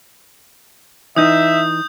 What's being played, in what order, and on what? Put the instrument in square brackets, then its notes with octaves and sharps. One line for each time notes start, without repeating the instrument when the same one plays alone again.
[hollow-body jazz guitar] E3 D#4 [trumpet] E5 [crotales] D#6 G6